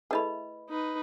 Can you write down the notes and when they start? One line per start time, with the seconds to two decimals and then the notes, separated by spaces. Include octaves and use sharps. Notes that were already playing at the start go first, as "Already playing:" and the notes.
0.11 A3 E4 G#4 B4 D#5 B5
0.69 D#4 B4